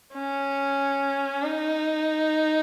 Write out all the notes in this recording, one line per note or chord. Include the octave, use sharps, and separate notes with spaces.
C#4
D#4